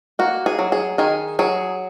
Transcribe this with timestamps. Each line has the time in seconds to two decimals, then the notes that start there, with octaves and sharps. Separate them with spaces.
0.19 A#3 F#4
0.46 G#4
0.59 F#3
0.72 G#4
0.98 D#3 G#4
1.39 F#3 G#4